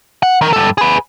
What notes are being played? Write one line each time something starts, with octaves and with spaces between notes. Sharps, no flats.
F#5
D#3 A#4
G2 A4
G#4 B4